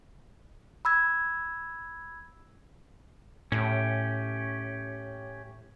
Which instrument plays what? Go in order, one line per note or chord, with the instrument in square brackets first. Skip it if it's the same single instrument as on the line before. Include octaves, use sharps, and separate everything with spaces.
[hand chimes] B5 E6 G#6
[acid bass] A2 [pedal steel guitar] C#4 G4